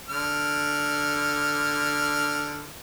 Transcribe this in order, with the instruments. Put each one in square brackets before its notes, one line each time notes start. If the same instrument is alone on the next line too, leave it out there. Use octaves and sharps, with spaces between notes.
[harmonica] D3 F6